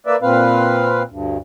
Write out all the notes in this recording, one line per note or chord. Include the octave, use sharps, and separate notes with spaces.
A#3 B4 D5 E5
A#2 C4 B4 F5
D2 G2